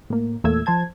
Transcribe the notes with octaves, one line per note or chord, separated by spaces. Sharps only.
A2 A#3
E2 A#2 A3 E6 G#6
F3 C5 A5 G#6